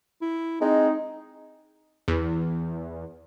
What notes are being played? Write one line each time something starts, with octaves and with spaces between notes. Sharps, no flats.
E4
G#3 C4 D#4
E2